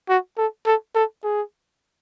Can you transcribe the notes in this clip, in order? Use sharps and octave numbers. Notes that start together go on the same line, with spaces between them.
F#4
A4
A4
A4
G#4